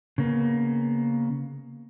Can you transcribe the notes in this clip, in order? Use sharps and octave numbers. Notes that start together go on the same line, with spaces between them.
C#3 A#3 B3